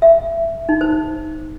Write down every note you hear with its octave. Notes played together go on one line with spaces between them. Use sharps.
E5
D#4
C5